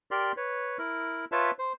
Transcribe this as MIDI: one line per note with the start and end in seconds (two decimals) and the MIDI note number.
0.11 0.32 67
0.11 0.32 70
0.11 0.32 74
0.11 0.32 84
0.37 0.78 71
0.37 0.78 73
0.78 1.25 64
0.78 1.25 70
1.32 1.51 65
1.32 1.51 71
1.32 1.51 73
1.32 1.51 76
1.32 1.51 81
1.59 1.73 72